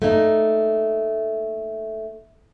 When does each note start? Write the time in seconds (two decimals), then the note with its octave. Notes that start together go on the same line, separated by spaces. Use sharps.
0.02 A3 A#3 D#4